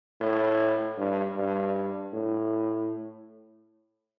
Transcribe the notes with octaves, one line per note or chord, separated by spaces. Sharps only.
A2
G2
G2
A2